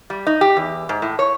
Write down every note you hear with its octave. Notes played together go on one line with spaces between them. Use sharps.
G3
D#4
G4
E2
G#2
A2
C#5